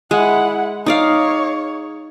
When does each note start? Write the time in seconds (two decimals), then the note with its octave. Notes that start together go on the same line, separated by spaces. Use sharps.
0.11 G#3 E4 F#5
0.86 D#4 C#5 D5 F5